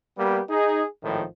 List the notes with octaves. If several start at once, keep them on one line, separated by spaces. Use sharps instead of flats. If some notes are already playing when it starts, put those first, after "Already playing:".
G3 A#3 B3 G4
D#4 G#4
G#1 A2 D#3 F3